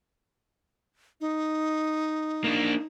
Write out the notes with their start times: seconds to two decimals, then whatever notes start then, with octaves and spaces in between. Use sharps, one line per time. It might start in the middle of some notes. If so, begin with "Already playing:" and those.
1.21 D#4
2.44 A#3 D4